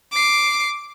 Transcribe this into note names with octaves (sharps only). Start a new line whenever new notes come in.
D6 C7